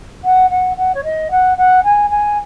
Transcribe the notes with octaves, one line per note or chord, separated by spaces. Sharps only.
F#5
F#5
F#5
C#5
D#5
F#5
F#5
G#5
G#5